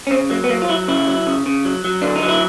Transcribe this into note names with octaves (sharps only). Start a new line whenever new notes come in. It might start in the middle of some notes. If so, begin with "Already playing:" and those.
C#4
C#3 C4
F#3 A#3
B3
F#3 A#3
F4
F#3 E4
C#3 E4
F#3
C#3
C#3
F#3
F#3
D3 D4
D#4
F#3
E4